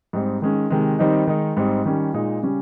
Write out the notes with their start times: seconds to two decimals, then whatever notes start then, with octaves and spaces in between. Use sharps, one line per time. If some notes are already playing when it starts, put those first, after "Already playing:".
0.13 G#2 G3 C4 D#4
0.42 D#3 G#3 C#4
0.70 C3 D#3 G#3
0.99 D#3 G3 C4 D#4
1.27 D#3 G#3 D#4
1.57 G#2 G3 C4 D#4
1.86 D#3 G3 C#4
2.13 A#2 G#3 D#4
2.43 C#3 G3 C#4